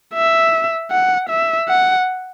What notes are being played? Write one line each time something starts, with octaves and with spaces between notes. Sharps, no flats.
E5
F#5
E5
F#5